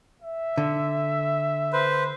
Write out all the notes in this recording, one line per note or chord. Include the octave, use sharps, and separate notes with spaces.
E5
D3
B4 C5